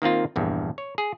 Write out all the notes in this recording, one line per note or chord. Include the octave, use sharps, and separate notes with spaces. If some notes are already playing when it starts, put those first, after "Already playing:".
D#3 A#3 C4 F4
A#1 E2 G2
C#5
G#4